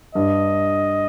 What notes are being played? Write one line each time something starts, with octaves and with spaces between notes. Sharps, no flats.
G2 D#5